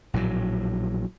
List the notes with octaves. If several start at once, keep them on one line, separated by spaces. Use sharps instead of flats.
A#1 A2 C#3 F#3